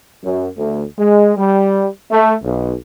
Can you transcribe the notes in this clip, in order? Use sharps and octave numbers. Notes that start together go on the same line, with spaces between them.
F#2
D2
G#3
G3
A3
B1